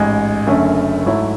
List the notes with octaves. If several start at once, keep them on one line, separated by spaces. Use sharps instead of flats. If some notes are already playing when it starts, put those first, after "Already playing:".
Already playing: A1 G#2 G#3
F#1 F#2 D3 A3 C#4
G#2 F#3 A3 E4